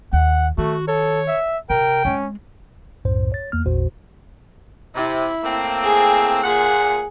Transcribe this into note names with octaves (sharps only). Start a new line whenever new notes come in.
D#2 F#5
D#3 A3 F#4
A4 C#5
E5
C3 A#4 G5
G#3 C4 C#4
C2 F#2 A2 C5
C#5 A6
E2 A#3 F6
A1 E2 A#2 F#4 C5
C3 E4
A2 A#3 C4
G#4
A#2 G#4 F#5